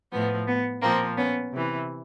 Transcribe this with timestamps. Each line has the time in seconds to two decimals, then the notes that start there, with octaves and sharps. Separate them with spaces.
0.12 A2 F3 B3
0.47 B3
0.82 A#2 F3 A#3 C4
1.17 B3 C#4
1.52 C3 E3